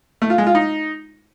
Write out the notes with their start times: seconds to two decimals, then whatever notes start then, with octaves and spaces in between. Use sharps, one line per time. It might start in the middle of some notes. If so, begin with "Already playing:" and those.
0.22 A3
0.30 F4
0.38 G#3
0.46 F4
0.55 D#4